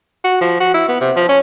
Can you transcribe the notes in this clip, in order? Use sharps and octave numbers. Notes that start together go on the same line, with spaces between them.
F#4
F3
F#4
E4
B3
C3
F3
C#4